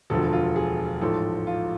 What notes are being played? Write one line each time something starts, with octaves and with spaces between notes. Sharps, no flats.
E1 D2 D3 F3 A4
F4
G#4
A1 G#2 F3 A4
F4